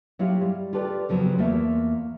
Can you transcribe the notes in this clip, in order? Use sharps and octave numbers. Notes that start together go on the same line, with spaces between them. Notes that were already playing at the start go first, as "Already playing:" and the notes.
F#3 E4 F4 G4 F5
G3
F4 G4 A4 B4 D5
F2 C#3 F3 F#3 B3 C4
E2 A3 A#3 F4 E5